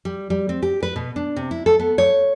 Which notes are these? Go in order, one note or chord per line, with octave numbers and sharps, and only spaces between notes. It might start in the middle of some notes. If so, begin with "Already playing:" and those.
G3
G3
C4
G4
B4
B2
D4
C3
E4
A4
B3
C#5